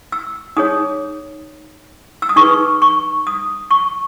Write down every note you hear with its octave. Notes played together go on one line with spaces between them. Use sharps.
E6
D#4 G#4 C#5 D#6
E6
D#6
D#4 G#4 B4 C#6
C#6
D#6
C#6